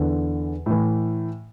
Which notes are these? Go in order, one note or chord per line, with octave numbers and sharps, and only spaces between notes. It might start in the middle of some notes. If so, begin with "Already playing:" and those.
Already playing: E2 D3
A2 E3